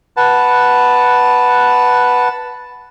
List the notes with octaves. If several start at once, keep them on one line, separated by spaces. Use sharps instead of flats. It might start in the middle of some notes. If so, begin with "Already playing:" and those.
B4 F#5 A5